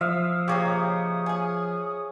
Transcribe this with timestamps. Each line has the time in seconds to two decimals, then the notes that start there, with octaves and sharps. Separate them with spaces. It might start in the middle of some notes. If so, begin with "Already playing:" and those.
0.01 F3 E5 F5 D#6
0.48 C#3 A#3 D#4 G4 C#5
1.26 G#4 C#5 G#5